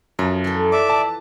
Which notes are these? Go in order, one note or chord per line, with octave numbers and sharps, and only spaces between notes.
F#2 F3
E3 F3 A4
B4 D5 E5 D6
A5